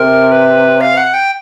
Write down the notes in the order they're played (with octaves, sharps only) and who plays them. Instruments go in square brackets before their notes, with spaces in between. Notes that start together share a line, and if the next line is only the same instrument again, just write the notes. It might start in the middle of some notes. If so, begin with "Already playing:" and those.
Already playing: [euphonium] C3 [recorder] A#4
[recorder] B4
F5
F#5
G5